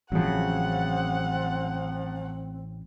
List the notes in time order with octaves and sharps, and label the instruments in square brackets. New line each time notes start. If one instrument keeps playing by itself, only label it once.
[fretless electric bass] A1 C#3 [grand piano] F3 F#3 [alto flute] C4 [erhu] F#5